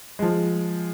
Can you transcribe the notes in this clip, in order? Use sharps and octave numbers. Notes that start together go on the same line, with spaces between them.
F3 G#3